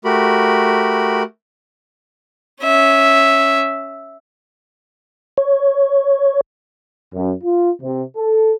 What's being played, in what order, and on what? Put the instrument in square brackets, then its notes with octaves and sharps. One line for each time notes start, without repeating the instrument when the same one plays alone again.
[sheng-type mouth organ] A3 F#4 G4 A#4 B5
[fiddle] C#4 E5
[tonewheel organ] C#5
[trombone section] F#2
F4
C3
A4